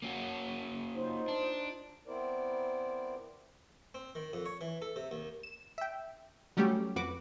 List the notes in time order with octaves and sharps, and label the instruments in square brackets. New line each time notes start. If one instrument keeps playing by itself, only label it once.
[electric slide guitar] A#3 C#4 F#4
[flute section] D#4 F4 C5
[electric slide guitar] D4
[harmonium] B3 C4 E4 A#4 C5 D5
[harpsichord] C4
D#3
F2
C#5
E3
A4
C3
D#2
[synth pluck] E7
E5 G5
F#3 G3 A3 C#4 G4
F2 F#4 B4 D6